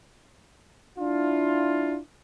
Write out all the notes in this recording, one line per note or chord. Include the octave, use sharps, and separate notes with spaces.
D4 E4 F4